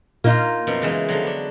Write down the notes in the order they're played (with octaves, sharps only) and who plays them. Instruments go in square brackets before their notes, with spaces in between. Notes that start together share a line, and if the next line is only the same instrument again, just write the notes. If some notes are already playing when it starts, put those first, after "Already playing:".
[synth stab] A#2 [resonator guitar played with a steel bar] A#3 D#4 F4
[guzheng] F#2 B2 F3
C#3 E3 G#3
D3 F3 F#3
B3 D4